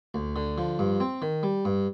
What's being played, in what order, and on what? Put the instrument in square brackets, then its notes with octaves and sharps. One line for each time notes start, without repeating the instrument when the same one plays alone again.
[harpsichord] D2
D3
F3
G2
C4
D#3
G3
G2